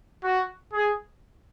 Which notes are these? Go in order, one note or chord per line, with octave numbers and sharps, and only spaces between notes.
F#4
G#4